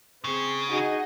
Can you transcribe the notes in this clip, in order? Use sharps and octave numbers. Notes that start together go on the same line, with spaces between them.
C#3 C4 G#4
D#4 F#4 G#4 D#5